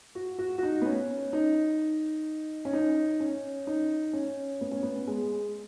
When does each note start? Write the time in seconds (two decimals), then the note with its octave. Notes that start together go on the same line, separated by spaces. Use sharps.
0.15 F#4
0.39 F#4
0.58 F#4
0.63 D#4
0.82 B3
0.86 C#4
1.33 D#4
2.65 C#4
2.73 D#4
3.20 C#4
3.67 D#4
4.13 C#4
4.61 B3
4.72 C#4
4.83 B3
5.07 G#3